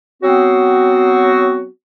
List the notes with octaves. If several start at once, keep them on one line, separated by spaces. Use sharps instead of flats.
F#3 B3 C4 F#4